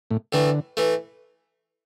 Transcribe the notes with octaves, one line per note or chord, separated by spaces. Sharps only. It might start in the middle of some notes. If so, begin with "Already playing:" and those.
A2
A2 D3 E3 A3
E3 A3